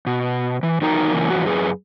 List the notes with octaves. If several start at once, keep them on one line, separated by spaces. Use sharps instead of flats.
B2
E3
E2 D#3 F#3 D#4 A#4 A#5
F#2 C#3 E3 A#3
F2 E3 F#4
F#2 G#4 B4